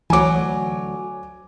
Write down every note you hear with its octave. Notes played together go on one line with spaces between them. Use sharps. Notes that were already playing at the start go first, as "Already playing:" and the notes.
D2 E3 F#3 G#5 D6